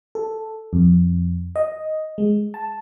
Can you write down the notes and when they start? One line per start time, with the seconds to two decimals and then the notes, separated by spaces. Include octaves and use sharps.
0.15 A4
0.73 F2
1.56 D#5
2.18 G#3
2.54 A5